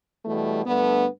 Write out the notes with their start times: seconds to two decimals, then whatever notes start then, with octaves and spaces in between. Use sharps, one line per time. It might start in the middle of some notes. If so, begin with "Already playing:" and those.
0.25 E2 B2 G3 A3
0.65 G2 D3 A3 B3